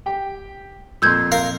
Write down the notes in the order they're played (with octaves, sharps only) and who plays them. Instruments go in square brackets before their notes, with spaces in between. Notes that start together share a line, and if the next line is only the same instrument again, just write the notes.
[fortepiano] G4 G5
[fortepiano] F2 A#2 C6 [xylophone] E6 G6 G#6
[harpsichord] A#4 F5